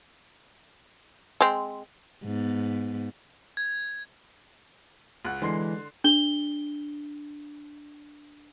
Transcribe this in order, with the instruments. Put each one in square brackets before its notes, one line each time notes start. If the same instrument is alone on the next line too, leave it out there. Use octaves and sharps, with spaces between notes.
[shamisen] G#3 C4
[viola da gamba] G#2 B3
[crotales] G#6
[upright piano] C#2 F#5 F#6
[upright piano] D3 C6 C7 [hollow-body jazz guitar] E3 G#3
[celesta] D4 G7